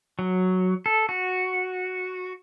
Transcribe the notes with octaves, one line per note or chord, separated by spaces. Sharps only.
F#3
A4
F#4